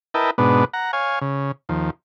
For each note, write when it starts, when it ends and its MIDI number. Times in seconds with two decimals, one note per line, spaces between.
0.14 0.31 64
0.14 0.31 70
0.14 0.31 71
0.14 0.31 75
0.14 0.31 79
0.14 0.31 81
0.38 0.65 44
0.38 0.65 47
0.38 0.65 59
0.38 0.65 62
0.73 0.91 78
0.73 0.91 82
0.93 1.19 73
0.93 1.19 77
0.93 1.19 80
1.21 1.52 49
1.69 1.90 39
1.69 1.90 53